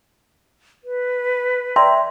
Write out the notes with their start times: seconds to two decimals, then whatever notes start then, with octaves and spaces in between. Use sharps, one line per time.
0.84 B4
1.76 D5 E5 G5 A#5 C6